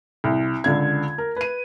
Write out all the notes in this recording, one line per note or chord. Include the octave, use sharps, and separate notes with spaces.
C2
C#2 D3 G#6
A#4
B4 D#7